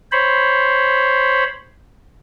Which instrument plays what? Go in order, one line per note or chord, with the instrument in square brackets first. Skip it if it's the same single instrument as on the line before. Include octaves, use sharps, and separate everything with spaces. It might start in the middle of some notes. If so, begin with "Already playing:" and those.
[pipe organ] C5 C#5 B5